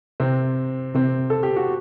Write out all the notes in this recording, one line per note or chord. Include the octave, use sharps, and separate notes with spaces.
C3 C4
C3 C4
A4
G4
F#4